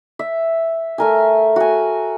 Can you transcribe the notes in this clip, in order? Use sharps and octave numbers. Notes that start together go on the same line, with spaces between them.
E5
A3 A#4 G#5
F#4 G#5